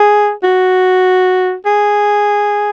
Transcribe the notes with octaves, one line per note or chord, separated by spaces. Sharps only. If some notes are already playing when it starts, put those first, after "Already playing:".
Already playing: G#4
F#4
G#4